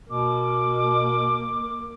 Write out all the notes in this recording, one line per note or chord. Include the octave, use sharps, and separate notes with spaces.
B2 A#3 D6